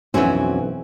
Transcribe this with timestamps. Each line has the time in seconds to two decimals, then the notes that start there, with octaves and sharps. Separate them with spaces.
0.14 B1 F2 E3 C4 C#4 F#4